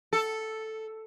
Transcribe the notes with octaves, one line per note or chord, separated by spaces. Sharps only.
A4